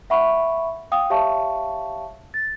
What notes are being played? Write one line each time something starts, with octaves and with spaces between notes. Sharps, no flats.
E5 F#5 B5 C#6
F5 G5 D#6
G4 C#5 E5 F5 A5 C#6
A6